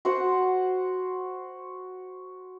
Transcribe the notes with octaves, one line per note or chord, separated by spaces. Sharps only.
F#4 C5 F#5